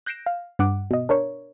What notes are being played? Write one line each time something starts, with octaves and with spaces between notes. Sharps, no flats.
F#6 G6 A#6 C7 D7 E7
F5
G2 F#5 D6
B2 D#5
D4 A#4 C#5